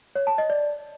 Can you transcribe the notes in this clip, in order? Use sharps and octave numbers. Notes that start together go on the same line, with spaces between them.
C#5
A5
D#5
D5